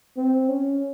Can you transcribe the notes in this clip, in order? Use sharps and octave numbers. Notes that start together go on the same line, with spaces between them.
C4
C#4